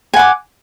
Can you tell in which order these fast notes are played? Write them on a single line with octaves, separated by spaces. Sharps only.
G#5 F#5 D6